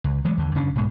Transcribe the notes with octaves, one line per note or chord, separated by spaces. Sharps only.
C#2
E3 F#3 G#3 A3
D#2 D3
F#2 C#3 C#4 D4
B1 G#2 B2 G#3